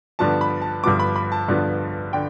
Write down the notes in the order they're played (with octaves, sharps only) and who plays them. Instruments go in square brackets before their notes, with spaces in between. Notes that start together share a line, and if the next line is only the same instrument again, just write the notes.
[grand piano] G2 D3 F3 B3 A5
B5
A5
G2 D3 F3 B3 D6
B5
B5
A5
G2 D3 F3 B3
D3 G5